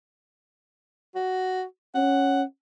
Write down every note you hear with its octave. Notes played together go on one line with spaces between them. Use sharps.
F#4
C#4 F#5